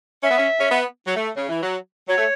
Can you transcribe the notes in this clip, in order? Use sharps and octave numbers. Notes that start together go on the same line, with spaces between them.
C#4 E5
B3
C#4
C#4
B3
F#3
A3
C#3
E3
F#3
F#3 C#5
A3